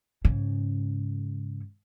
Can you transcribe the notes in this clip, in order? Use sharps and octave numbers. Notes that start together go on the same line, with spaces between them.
G#2 C#3